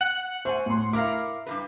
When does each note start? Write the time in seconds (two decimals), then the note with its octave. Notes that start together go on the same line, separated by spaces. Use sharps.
0.01 F#5
0.45 A3 C5 G#5
0.66 A2 C6
0.93 E4 A#4 F5 D6
1.46 G2 C3 B4